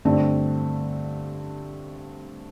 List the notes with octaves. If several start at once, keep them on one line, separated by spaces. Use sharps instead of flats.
G2 D3 A3 C4